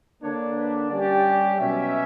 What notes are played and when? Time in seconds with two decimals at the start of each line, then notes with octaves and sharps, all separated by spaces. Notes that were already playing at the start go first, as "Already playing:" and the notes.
0.22 D3 A#3 D4 C#5
0.56 B4
0.90 G3 C#4 G4 D5
1.59 B2 F#3 C#4 E5